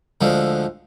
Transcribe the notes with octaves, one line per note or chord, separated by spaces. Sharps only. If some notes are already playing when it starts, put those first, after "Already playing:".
D2 D3 F3 G#3